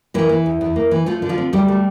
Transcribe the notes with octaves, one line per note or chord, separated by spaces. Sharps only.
E3 A#3 E4
E3
E2
E2
A#3
E3
F3 A3 F4
D3
F3 F4
C4
D2 G3 G4
A3